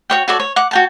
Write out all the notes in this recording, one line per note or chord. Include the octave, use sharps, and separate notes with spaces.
F#4 C#5 G5
F#4 A4 C#5 D5
C#5
F#5 D6
F#4 G5 A5